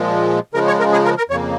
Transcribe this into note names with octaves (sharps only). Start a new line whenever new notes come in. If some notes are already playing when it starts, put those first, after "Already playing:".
Already playing: A#2 F3 G#3
C#3 F3 G#3 A#4
C#5
A#4
G#4
A#4
A#4
F2 C#3 A#3 C#5